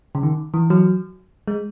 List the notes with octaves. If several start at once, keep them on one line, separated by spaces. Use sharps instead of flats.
C#3
D#3
E3
F#3
G#3